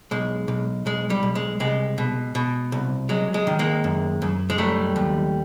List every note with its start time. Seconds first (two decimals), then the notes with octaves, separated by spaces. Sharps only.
0.11 B1 G#3
0.48 B1
0.86 B1 G#3
1.10 G3
1.23 B1
1.35 G#3
1.60 C2 G#3
1.98 B2
2.35 B2
2.72 C2
3.09 F#3 G#3
3.34 G#3
3.47 D#3
3.59 G#3 A#3
3.84 F#2
4.22 F#2
4.50 G#3
4.58 F#3 G3 A3
4.96 D#2